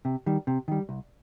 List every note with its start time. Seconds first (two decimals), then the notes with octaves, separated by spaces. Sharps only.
0.05 C3
0.26 D#3 G3
0.47 C3
0.68 D#3 G3
0.89 C2